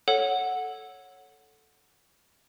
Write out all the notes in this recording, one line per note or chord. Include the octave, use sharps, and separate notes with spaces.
A4 C#5 F#5